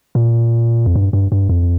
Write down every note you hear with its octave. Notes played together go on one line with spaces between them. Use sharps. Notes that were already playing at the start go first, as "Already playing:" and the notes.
A#2
F2
G2
G2
G2
F2